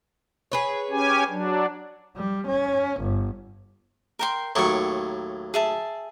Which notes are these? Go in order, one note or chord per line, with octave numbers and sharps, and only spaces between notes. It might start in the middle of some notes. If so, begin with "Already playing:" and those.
G#4 B4 C#5
C#4 G4 G#5
F#3 D4
G3
C#4
G1
A#4 G5 C6
D#2 A2 F#3 A#4 C#6
G#4 E5 A5